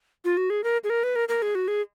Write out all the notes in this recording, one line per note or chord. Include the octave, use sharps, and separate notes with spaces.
F4
F#4
G#4
A#4
G#4
A#4
B4
A#4
A#4
G#4
F#4
G#4